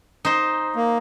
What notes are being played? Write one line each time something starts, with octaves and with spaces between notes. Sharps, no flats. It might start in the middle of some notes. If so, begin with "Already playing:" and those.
D#4 C5
A#3